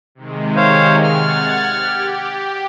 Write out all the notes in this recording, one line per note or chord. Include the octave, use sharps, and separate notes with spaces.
C3 D#3 G#3
C5 C#5 F5
F#5 F6 G#6 A6
G4